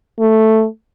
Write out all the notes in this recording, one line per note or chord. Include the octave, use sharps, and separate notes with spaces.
A3